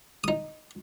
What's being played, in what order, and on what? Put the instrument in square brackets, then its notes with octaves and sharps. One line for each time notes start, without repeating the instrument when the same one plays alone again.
[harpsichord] D#4 D#6